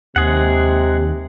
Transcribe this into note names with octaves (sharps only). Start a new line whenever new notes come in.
D#2 C3 G#3 G#4 F#5